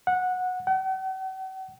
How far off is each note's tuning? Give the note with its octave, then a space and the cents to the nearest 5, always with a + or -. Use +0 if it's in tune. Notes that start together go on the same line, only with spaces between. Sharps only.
F#5 -15
F#5 +45